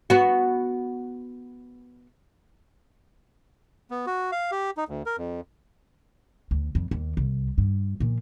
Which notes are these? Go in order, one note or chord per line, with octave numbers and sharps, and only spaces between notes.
B3 F#4
B3
F#4
F5
G4
D#4
D2
A#4
F2
D2
F2
D#2
C2
G2
A#2 F3